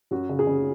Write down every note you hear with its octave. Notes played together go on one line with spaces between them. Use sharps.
F#2 F#4
C#3
G#4
C#3